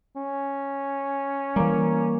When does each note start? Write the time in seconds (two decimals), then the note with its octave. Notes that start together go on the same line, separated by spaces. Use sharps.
0.16 C#4
1.56 E3 G3 A#3